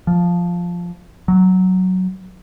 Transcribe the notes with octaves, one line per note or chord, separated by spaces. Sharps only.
F3
F#3